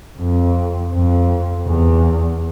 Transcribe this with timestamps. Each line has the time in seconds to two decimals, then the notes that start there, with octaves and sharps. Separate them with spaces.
0.18 F2
0.92 F2
1.66 E2